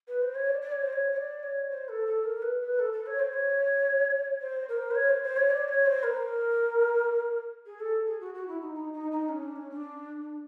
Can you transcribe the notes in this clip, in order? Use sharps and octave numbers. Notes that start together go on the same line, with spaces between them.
B4
C5
C#5
D5
D5
C#5
C5
C#5
C#5
D5
C#5
C5
A4
A4
A#4
B4
B4
A4
A4
C#5
C5
C#5
C5
A#4
C5
C#5
C5
C5
C#5
D5
C#5
C5
A#4
G#4
A4
G#4
F#4
F#4
E4
D#4
D#4
D#4
D#4
C#4
D4
C#4
D4